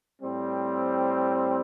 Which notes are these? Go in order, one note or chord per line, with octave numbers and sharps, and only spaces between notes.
A2 G3 C4